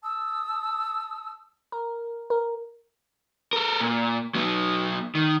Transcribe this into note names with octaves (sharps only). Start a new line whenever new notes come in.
A5 D#6 E6
A#4
A#4
A4 A#4
A#2
F#3 B3
D#3